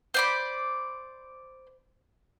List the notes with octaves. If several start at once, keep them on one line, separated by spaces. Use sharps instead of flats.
C5 D5 B5